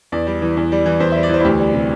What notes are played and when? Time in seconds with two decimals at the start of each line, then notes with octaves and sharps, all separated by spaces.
0.12 E2 D5
0.27 G3
0.42 E3
0.57 E2
0.72 G3
0.86 E3
1.00 E2 C5
1.12 G3 E5
1.23 D5
1.29 E3 C5
1.40 E4
1.45 D2 G4
1.59 G3
1.74 C3